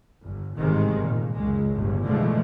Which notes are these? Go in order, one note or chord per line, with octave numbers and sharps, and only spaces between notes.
G1
A1 G#2 C3 D#3 G#3
G1 A#2
C#2 F#2 G#3
G1 C#2 A2
B2 D3 E3 F3 G#3 A3